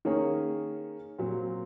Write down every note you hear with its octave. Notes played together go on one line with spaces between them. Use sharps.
D#3 A#3 C#4 G#4 C#5
A#2 F#3 C4